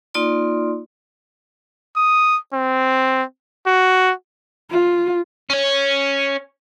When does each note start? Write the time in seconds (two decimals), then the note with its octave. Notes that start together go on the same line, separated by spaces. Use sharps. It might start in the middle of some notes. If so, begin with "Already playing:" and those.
0.14 A#3 D#4 F4 D5 C6
1.96 D#6
2.53 C4
3.67 F#4
4.71 F4
5.50 C#4 C#5